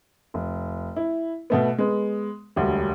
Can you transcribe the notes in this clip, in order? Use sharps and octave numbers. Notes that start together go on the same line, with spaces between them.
F1
E4
B2 A3 B3
G#3 B3
E1 D2 G3